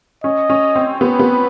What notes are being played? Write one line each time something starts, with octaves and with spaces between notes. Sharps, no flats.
C#4 D#5
C#4
C4
B3 B4
B3